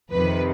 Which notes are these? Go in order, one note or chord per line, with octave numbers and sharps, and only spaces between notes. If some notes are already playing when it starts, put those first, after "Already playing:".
F2 C3 D#3 B4